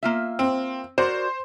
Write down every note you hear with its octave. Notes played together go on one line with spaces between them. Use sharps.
A#3 F4 E5
C4
F#4 A#4 C5 D5